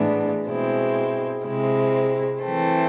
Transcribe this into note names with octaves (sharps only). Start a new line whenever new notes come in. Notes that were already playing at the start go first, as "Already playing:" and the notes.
Already playing: A2 E3 G#3 B3 D4
B2 G#3 C4 E4
C3 G#3 C4 E4
E3 A3 C4